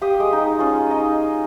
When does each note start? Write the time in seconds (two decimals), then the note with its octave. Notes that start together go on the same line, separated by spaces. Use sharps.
0.02 G4 F5 G5 D#6
0.20 G#3
0.33 D#4
0.59 C#4 F4
0.90 D#4 D#5